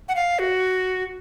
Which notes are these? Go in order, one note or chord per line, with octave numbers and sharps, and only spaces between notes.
F#5
F5
F#4